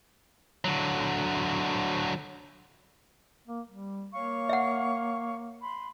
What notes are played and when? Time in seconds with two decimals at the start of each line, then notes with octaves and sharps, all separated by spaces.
0.65 D3 F#3
3.48 A#3
3.69 G3
4.12 A#3 C#5 F5 C#6
4.49 E5 F#5
5.61 B5 C6